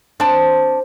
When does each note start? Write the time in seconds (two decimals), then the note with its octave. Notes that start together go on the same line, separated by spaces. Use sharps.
0.20 C4 D4 A5